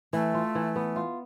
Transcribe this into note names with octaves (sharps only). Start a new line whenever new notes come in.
E3 A3
F4
E3
B3
F4